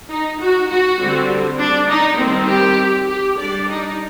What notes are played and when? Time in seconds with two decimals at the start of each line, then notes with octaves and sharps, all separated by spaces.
0.10 D#4
0.41 F#4
0.70 F#4
1.00 D3 G3 C4
1.59 D4
1.89 D#4
2.19 D#3 G3 C4
2.48 G4
3.08 G4
3.38 G3 D4 D5
3.69 D#4